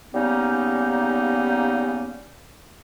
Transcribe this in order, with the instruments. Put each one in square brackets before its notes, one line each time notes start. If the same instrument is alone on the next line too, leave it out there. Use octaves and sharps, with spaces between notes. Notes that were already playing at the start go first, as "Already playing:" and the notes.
[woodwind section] C#3 G3 A#3 B3 C#4 D#4